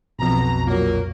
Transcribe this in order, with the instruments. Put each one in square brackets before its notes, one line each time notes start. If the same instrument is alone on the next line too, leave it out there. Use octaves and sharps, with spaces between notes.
[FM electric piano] B1 F2 [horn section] B2 A#5
[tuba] A#2 [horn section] F#3 A#3